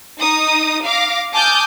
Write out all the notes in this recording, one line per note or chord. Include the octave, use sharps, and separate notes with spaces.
D#4 D#6
F5 D6 A#6
G#5 A5 D6 D#6 F6 G6